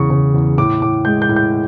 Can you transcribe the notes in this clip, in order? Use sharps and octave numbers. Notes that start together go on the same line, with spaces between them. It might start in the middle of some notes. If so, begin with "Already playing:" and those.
Already playing: E2 C#3 E3 C#6
C#3
E2
A2 D6
A2 D6
G#3 G6
G6
A2
G6